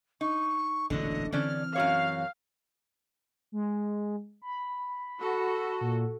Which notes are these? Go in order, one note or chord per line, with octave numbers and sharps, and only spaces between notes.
D#4 C#6
E1 A1 A#2 D3 F#3 D#5
D3 E3 C4 C#4 D5 F6
F#2 F#4 C#5 F5
G#3
B5
F#4 A4
A#2